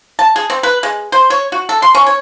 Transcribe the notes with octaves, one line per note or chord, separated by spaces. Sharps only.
A5
G#4
C4
B4
G#3
C5
C#5
F#4
A4
C6
C#4
C#5